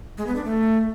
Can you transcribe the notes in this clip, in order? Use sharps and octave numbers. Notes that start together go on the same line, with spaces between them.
G#3
B3
D4
A3